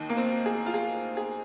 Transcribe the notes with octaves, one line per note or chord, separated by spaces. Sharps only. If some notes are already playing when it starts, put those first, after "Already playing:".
Already playing: D#2 D#3
A#3
C4
G#4
F4
G#4
G#4